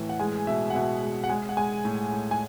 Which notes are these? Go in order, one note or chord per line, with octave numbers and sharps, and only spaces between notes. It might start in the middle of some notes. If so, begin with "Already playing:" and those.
Already playing: A2 E3
F#5
G#3 G#5
B2 E5
F#5
B2 E5
G#3
F#5
G#3 G#5
F#5
G#3 G#5
A2
A2
G#5